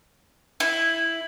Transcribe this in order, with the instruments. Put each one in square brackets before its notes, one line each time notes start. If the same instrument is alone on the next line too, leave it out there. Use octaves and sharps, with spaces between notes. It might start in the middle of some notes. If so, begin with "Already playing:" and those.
[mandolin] E4